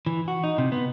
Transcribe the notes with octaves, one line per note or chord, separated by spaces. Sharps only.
E3
F#4
D#4
C3
B3